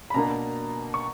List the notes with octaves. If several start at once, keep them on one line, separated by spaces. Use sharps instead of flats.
B5
B2 A#3 D4 A#5
C#6